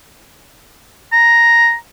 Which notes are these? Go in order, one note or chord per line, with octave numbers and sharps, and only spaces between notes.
A#5